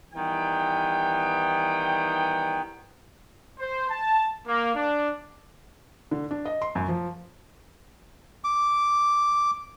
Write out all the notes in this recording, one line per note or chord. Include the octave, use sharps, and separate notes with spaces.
D#3 E3 G3 B3 G5
C5
A5
A#3
D4
D3
D4
D#5
C6
F#2
F3
D6